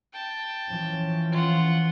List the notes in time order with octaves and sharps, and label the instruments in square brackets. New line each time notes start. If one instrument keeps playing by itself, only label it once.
[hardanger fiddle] G5 A5
[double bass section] E3 F3 C#4
[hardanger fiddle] F4 F#5